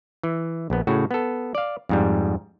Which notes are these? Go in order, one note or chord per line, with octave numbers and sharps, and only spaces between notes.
E3
A#1 B3
A2 C#3 F#4
B3 A4
D5 F5
F2 G#2 G3